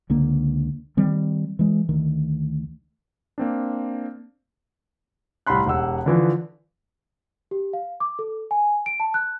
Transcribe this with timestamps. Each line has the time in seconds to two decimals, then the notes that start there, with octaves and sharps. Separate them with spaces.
0.10 C#2 D3 A#3
0.97 D#3 G3 C4
1.59 E3 G#3
1.89 D2 D#3
3.38 A#3 C4 D4
5.47 C2 A2 B5 C6 F#6
5.66 E1 G4 F#5 E6
6.06 D3 E3 F3
7.51 G4
7.73 F5
8.00 D6
8.19 A4
8.51 G#5
8.86 D7
9.00 A5
9.14 F#6